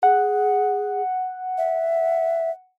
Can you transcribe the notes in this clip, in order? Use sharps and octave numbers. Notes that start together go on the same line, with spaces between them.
G#4 F#5
E5